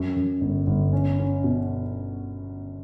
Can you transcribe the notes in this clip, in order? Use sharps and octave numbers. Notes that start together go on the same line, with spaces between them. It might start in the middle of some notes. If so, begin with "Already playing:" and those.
Already playing: F#2
F#2
G1
G1
C#4
C#4
B2